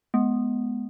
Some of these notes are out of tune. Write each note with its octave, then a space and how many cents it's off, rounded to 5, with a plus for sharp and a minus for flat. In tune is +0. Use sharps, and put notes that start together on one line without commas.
G#3 +25 B3 +0